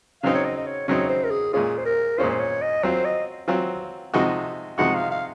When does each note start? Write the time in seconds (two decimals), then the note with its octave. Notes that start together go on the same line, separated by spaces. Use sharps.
0.23 C#3 F#3 C4 D#4 F5
0.35 C#5
0.45 D#5
0.56 D#5
0.66 C#5
0.88 C#3 F#3 C4 D#4 C#5
1.09 C5
1.24 A#4
1.31 G#4
1.53 A#2 G#3 C#4 F4 G#4
1.78 C5
1.85 A#4
2.18 A#2 G#3 C#4 F4 C5
2.30 C5
2.40 C#5
2.62 D#5
2.83 F#3 C4 F4 C5
3.05 D#5
3.48 F#3 C4 F4
4.14 C3 F3 G#3 D#4 F#4
4.78 C3 F3 G#3 D#4 F#4 F#5
4.95 F5
5.11 F5